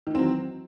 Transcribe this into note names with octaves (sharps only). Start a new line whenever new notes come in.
D#3 E3 F#3 C4